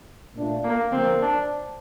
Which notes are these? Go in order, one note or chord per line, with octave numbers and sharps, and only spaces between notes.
A#2 A3 D4 F4
A#3
D3 F3 A#3 C4
D4